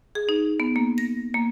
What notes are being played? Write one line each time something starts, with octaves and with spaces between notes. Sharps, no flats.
G#4
D#4
B3
A#3
A#6
A#3